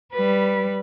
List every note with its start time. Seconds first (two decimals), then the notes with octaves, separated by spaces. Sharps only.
0.13 G3 B4